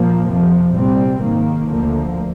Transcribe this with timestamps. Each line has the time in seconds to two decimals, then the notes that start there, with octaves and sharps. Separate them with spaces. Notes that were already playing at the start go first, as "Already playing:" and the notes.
Already playing: A#2 F3 A#3
0.26 F2 C3 F3
0.75 C2 A#2 G3 C4
1.22 G#2 D#3 A#3
1.70 D2 D3 F3 A#3